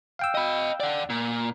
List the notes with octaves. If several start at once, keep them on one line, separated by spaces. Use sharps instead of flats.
F5 G5 E6
D#5 B5
D5 F#5
A#2